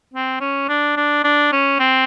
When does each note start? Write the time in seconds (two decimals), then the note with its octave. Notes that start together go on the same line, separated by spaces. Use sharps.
0.14 C4
0.40 C#4
0.68 D4
0.97 D4
1.24 D4
1.52 C#4
1.79 C4